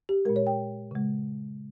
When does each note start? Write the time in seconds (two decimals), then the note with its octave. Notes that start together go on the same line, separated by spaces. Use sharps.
0.09 G4
0.25 A#2 G#3 A#4
0.36 C#5
0.47 G5
0.91 C#3 G#3